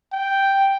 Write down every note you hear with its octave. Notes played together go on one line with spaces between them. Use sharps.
G5